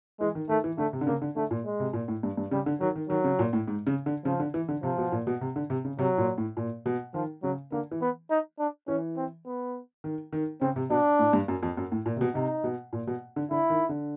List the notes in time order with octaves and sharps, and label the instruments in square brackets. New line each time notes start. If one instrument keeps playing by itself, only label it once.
[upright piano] E3 [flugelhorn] G#3
[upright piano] D#3
[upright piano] D#3 [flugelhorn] A3
[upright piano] E3
[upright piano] D3 [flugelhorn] A3
[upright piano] C3
D3
[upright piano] C#3 [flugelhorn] A#3
[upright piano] D3
[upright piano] D3 [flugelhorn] A3
[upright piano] A#2
[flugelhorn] G#3
[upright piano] C3
A#2
A2
G2
G2
[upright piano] C#3 [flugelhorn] G3
[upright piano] D3
[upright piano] D#3 [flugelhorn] F#3
[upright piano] D#3
[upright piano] D#3 [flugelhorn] F#3
[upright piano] C#3
A#2
A2
G#2
C#3
D3
[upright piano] C#3 [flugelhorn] F3
[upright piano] D3
E3
D3
[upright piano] C3 [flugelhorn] F3
[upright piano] B2
A#2
B2
C3
D3
C3
C#3
[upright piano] C3 [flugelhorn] F#3
[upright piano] A#2
A2
A#2
B2
[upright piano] D#3 [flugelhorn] F3
[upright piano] C#3 [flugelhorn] F#3
[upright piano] D3 [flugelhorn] A#3
[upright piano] E3
[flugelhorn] B3
D#4
D4
[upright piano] E3 [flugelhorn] C#4
[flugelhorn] C4
B3
[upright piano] D#3
D#3
[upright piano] C#3 [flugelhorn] C4
[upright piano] C3
[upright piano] B2 [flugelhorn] D4
[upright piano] A2
G2
F#2
F2
F#2
A2
A#2
C3
B2
[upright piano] C3 [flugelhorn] D#4
[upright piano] B2
A#2
B2
D3
[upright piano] D3 [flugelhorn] E4
[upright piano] D#3
D3